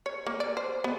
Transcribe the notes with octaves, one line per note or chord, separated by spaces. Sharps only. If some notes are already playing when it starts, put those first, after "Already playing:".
C#5
A#3
D5
C5
B3